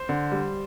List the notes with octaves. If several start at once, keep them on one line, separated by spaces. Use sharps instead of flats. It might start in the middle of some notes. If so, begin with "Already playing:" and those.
Already playing: C5
D3
G3